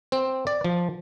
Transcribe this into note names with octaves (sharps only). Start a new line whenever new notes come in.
C4
D5
F3